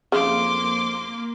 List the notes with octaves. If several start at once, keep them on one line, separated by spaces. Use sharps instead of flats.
F2 C#3 A#3 C6 D6